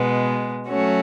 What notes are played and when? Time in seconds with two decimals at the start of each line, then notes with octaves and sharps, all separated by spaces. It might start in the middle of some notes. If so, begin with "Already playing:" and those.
Already playing: B2 G#3 B3
0.69 F#3 A3 C#4 F#4